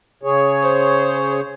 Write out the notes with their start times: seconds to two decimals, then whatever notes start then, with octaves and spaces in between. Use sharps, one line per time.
0.23 C#3 G#4 C#5
0.63 C5